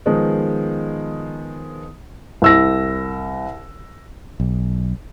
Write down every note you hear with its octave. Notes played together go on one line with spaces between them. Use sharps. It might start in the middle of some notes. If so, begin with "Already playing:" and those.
D#3 F3 G#3 B3
C2 E6 A#6
B1